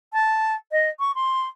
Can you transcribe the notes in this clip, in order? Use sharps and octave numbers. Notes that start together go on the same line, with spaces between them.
A5
D#5
C#6
C6